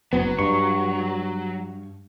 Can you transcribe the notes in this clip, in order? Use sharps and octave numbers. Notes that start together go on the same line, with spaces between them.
F#1 F#3 B3
G2 C#6